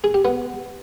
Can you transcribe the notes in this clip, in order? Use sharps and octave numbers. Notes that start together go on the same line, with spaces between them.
G#4
G4
B3